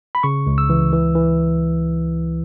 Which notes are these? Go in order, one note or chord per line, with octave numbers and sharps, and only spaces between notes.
B5
C#3 C#6
C#2
E6
E3
E3
E3